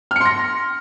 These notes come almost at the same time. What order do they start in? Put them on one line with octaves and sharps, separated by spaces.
F6 C#7 C6 A#6